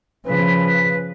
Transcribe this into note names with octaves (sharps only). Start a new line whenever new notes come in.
C#3 F3 B4